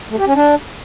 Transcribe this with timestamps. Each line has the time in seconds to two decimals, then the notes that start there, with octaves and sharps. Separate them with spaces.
0.10 A3
0.18 G4
0.26 C#4
0.34 D4